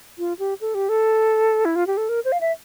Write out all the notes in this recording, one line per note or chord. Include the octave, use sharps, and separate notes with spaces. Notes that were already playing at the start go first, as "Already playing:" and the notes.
F4
G4
A4
G4
A4
E4
F4
G4
A4
A#4
C5
F5
E5